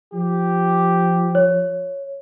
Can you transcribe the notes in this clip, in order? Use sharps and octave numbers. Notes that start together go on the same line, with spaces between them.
F3 G4
C#5